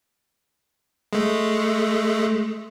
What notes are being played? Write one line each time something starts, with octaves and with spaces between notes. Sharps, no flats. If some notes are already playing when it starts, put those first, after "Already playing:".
G#3 A3